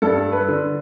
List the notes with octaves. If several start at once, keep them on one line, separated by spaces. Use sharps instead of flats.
G2 A4
B4
D3